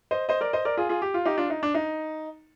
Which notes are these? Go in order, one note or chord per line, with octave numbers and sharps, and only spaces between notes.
C5 D#5
C5 D#5
A#4 D5
C5 D#5
A#4 D5
F4 G#4
F4 G#4
G4
F4
D#4 G4
D4 F4
D#4
D4
D#4